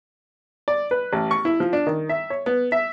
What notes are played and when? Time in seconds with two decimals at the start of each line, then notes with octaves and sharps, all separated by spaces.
0.68 D5
0.91 B4
1.13 A1
1.31 C#6
1.45 E4
1.60 F3
1.73 D4
1.87 D#3
2.09 E5
2.30 C#5
2.46 B3
2.72 E5